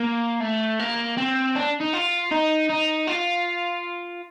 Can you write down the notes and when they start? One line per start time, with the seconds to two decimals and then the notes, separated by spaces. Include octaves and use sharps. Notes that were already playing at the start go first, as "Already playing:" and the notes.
Already playing: A#3
0.40 A3
0.79 A#3
1.17 C4
1.55 D4
1.80 D#4
1.93 F4
2.31 D#4
2.69 D#4
3.08 F4